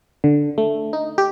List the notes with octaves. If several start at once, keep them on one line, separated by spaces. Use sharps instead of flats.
D3
A3
D#4
G4